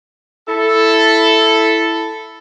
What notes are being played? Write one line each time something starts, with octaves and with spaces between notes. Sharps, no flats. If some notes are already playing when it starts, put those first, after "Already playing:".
E4 A4